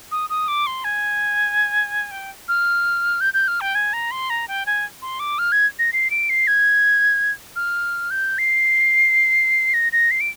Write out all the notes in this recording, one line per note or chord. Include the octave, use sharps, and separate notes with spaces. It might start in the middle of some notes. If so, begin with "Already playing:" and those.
D#6
D#6
D6
C6
G#5
G5
F6
G6
G6
F6
G5
G#5
A#5
C6
A#5
G5
G#5
C6
D6
F6
G#6
A#6
C7
D7
C7
G#6
F6
G6
C7
A#6
A#6
C7
D7